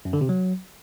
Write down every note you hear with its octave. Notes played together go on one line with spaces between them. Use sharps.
F#2
D3
C3
F#3